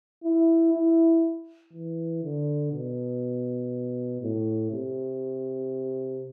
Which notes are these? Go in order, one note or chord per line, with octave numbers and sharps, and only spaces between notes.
E4
E4
E3
D3
B2
A2
C3